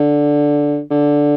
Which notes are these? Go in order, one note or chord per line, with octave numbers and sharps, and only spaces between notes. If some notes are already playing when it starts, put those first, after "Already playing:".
Already playing: D3
D3